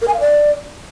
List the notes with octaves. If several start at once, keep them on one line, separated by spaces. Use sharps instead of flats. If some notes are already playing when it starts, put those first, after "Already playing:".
A#4
G#5
F5
D5